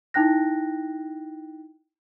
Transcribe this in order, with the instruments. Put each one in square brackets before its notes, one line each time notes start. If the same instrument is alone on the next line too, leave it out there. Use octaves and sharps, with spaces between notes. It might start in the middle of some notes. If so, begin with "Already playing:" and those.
[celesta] D#4 E4 G5 F#6 A#6